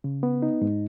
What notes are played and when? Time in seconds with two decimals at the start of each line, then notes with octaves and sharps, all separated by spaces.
0.04 C#3
0.23 B3
0.42 D#4
0.62 G#2